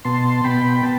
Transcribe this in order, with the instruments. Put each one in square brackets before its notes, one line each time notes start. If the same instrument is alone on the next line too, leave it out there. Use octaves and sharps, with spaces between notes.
[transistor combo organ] B2 A5 C6
B2 G5 B5
B3 A5